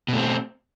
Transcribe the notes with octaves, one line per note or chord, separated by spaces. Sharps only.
B2 A3 C4